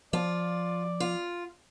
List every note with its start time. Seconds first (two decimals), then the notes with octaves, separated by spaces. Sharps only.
0.13 F3 F4 D5
1.00 F4